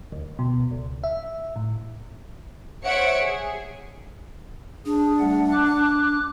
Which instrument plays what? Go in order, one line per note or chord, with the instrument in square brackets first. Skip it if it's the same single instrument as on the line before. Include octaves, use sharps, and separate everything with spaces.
[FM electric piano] D2
B2
C#2
E5
A2
[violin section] C5 C#5 E5 F#5 C#7 D7
G#4
[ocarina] D4 [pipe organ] G#4
[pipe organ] G3 A3 F#5
D6 F#6